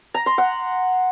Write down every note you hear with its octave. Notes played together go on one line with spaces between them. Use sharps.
A#5
C6
F#5